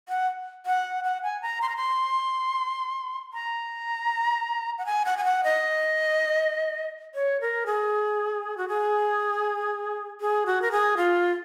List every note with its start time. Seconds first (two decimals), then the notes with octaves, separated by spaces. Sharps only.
0.09 F#5
0.66 F#5
1.04 F#5
1.23 G#5
1.42 A#5
1.62 C6
1.69 A#5
1.76 C6
3.33 A#5
4.78 F#5
4.86 G#5
5.05 F#5
5.17 G#5
5.24 F#5
5.44 D#5
7.15 C#5
7.41 A#4
7.66 G#4
8.57 F#4
8.68 G#4
10.21 G#4
10.46 F#4
10.62 A#4
10.72 G#4
10.97 F4